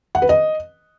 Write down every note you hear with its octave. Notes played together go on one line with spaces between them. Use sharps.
F#5
B4
D#5